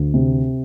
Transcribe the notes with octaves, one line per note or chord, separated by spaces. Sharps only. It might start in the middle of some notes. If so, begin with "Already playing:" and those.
Already playing: D2
C3